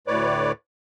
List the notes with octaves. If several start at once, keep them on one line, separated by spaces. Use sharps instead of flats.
D2 A2 B4 C#5 D5 D6